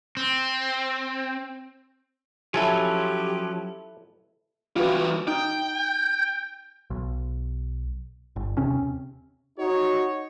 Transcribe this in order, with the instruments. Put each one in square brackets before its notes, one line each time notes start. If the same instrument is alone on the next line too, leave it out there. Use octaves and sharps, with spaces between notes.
[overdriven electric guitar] C4
[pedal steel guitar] F3 F#3 C#4 [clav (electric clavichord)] E4 A4 G#5 [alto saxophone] G4
[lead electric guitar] E3 G3 [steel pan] F4 F#4 B4
[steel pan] D#4 [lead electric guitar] G5
[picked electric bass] B1
G1
D#2 C3 C4 C#4
[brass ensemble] D#4 C#5 [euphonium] F#4